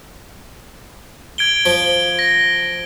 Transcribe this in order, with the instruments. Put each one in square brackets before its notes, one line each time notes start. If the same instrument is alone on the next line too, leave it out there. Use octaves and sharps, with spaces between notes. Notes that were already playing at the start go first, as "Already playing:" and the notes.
[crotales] G#6 D7 G7
[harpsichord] F3
[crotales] A#6